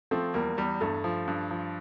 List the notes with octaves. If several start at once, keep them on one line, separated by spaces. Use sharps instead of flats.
F3 A3 C4
E2 G3 A#3
E2 G3
G2 A3
F3
G2
F3